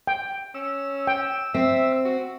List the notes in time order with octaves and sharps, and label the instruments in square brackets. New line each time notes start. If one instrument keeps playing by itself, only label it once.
[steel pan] G5
[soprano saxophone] C#4 [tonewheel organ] E6
[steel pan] G5
[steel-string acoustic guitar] C4 [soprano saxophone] E5
[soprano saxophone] F#4